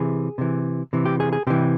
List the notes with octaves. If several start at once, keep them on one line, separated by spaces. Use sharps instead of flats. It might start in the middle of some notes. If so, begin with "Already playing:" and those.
Already playing: C3 E3 G#4
C3 E3
C3 E3
G4
G#4
G#4
C3 E3 G4